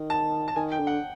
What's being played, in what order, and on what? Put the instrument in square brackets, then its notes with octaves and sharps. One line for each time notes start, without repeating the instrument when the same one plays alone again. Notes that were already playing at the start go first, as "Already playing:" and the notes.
Already playing: [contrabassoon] D#3
[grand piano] A5
A5
[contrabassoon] D#3 [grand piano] G#5
[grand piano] G5
[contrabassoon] D3
[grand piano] F#5